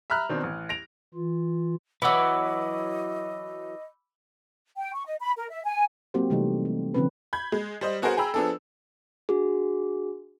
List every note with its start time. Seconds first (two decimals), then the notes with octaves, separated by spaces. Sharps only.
0.10 E5 A#5 B5 F6 F#6
0.29 B2 D#3 C4 D4
0.43 A1
0.69 A#6 D7 F7
1.14 E3 F4
2.02 E3 F#3 B4 D#5 F#5 B5 D6 E6
4.77 G5
4.95 C#6
5.06 D#5
5.21 B5
5.37 A#4
5.50 E5
5.64 G#5
6.14 F#3 A#3 C4 F#4 G4 C5
6.30 C3 E3 G3 A3 D#4
6.65 A3
6.94 D3 F3 C4 C#4 B4
7.33 B5 G6 G#6
7.52 G#3
7.81 G3 C5 D#5
8.02 B3 F#4 G#4 A#4 C5 F#5
8.17 G#4 G5 A#5 B5 E6
8.34 F3 B3 D4 G#4 A4
9.29 D4 F#4 G#4